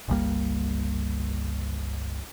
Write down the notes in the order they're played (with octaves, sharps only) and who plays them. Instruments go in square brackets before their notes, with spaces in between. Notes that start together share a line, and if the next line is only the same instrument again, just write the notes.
[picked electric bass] G1 C#2 G3 A#3